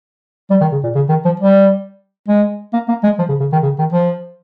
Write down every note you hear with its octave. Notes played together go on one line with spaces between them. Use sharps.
G3
D#3
C#3
A#2
C#3
D#3
F3
G3
G#3
A#3
A#3
G#3
F3
C#3
C#3
D#3
C#3
D#3
F3